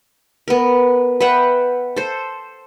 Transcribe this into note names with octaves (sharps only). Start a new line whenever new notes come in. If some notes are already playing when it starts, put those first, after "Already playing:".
B3 A#4
B4 E5 F#5 G5
A4 C5